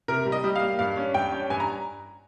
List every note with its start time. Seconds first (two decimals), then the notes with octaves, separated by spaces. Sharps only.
0.08 C3 A#4
0.26 G3
0.32 D#5
0.44 G3
0.56 F5
0.61 A#3
0.79 G2 F5
0.97 C#4
1.14 G2 G5
1.32 C#4
1.50 G2 G#5
1.60 A#5